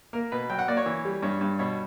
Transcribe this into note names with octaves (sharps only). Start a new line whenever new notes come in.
A#3 A#4
B2 B4
F#3 G5
F#5
A#3 D5
C#5
E3
G3
G2 C#5
G2
B2 C#5